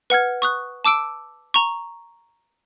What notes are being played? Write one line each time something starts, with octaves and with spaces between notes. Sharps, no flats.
B4 F#5 F6 G#6
C#6 D#6 F#6
A5 D6 E6 D7
A#5 C#6